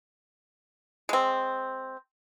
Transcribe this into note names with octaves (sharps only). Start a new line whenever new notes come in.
G#3 C4